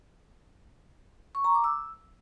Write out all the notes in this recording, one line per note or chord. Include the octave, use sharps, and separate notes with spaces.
C#6
A#5
D6
E6